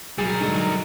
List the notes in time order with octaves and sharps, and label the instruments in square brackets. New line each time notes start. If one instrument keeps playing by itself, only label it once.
[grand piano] F#3 G#4 [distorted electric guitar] G3 A#4
[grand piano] G#2 D3 F#3